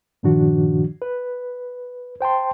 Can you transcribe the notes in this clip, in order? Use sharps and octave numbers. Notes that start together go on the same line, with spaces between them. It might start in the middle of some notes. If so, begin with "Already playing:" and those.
G2 A#2 D#3 F3 D4 F#4
B4
C5 G5 A5 C6